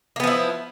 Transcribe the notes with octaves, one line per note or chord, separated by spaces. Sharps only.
F3 A#3 B3 E4